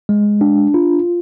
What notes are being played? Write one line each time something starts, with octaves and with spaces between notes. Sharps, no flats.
G#3
D4
F4